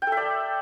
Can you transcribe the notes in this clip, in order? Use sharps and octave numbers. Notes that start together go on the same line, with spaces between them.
G5
A4
E5
D5